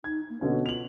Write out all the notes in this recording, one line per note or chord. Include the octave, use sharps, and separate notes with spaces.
D#4 G#6
A#3
B2 D3 C#4 C#5
F4 F7 F#7